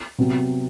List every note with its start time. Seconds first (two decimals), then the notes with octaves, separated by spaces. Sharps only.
0.18 C3 F#3 B3